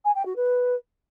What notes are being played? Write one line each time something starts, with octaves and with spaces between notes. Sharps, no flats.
G#5
G5
F#4
B4